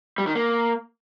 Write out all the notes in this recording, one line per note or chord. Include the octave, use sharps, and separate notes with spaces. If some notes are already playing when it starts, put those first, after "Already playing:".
G3
D#3
A#3